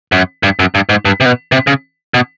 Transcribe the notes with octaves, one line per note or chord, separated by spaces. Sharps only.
F#2
G2
F#2
G2
G#2
G2
C3
B2
C3
C#3
B2